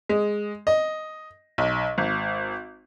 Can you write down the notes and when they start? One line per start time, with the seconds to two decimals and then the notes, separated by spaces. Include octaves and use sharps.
0.09 G#3
0.67 D#5
1.58 B1
1.98 G#1